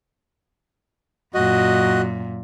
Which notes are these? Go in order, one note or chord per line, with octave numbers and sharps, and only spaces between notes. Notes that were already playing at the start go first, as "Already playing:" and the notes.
F#2 A#2 F#4 D#5